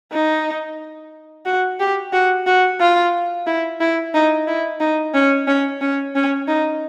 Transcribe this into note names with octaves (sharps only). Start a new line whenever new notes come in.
D#4
F#4
G4
F#4
F#4
F4
E4
E4
D#4
E4
D#4
C#4
C#4
C#4
C#4
D#4